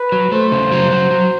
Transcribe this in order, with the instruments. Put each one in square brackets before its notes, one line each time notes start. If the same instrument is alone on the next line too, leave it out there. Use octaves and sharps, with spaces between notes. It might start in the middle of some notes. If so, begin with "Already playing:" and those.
Already playing: [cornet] B4
[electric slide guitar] F#3
[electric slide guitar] A3 [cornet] C5
[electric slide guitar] C#3
F#3
F#3
F#3